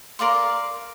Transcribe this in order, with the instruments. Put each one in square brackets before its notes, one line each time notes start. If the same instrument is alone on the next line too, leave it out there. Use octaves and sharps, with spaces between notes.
[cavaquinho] A#4 D5 F5 C6